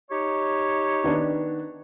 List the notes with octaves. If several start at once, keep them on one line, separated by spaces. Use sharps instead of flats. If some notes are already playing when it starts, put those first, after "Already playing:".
D#4 G4 C#5
D#3 B3 D4